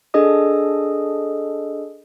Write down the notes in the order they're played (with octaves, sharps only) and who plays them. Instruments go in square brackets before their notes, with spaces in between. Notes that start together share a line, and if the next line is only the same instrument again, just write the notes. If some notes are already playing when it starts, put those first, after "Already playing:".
[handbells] D4 G#4 A4 D#5 D#6